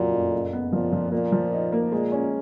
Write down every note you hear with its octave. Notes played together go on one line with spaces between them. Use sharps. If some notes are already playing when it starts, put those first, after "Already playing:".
Already playing: F2 A#2 C#3 F#3
F#1
F#1
B3
A#2 F3
F3
A#2 A#3
F3
D#4
A#3
A#2 G#3
C#4